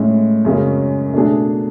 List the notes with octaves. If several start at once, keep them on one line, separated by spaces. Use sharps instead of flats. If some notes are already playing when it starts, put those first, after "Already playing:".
Already playing: A2 G#3 C#4
F#2 C#3 G#3 C#4 G#4
B2 A3 D4 G#4